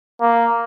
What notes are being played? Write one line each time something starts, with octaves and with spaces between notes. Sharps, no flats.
A#3